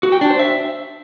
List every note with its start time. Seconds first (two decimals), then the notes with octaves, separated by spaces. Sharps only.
0.03 F#4
0.12 G5
0.21 D4
0.30 C5
0.39 E5